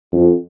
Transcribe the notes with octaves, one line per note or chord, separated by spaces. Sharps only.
F2